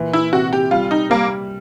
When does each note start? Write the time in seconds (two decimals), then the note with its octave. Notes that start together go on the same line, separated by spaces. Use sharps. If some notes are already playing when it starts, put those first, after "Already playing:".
Already playing: A#2 E3
0.13 E4
0.33 C3 F#4
0.53 G4
0.71 G3 F4
0.91 D#4
1.10 G3 A#3